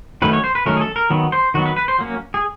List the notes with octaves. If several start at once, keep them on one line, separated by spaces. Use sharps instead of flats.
D#3 F#3 A3 C#4 B4
C#5
C5
B4
D#3 F#3 A3 C#4 A#4
G#4
A4
A#4
D#3 F#3 B3
C5
D#3 F#3 B3 F#4
B4
B4
C5
F#3 A#3 C#4
G#4